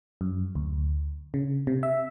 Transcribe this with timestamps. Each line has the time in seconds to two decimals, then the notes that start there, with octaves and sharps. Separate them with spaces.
0.21 F#2
0.55 D2
1.34 C#3
1.67 C3
1.83 E5